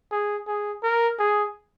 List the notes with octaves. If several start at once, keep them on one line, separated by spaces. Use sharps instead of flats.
G#4
G#4
A#4
G#4